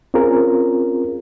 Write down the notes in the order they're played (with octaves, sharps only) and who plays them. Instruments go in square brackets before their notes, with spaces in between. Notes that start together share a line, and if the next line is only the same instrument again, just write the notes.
[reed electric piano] C4 C#4 F4 G#4 A#4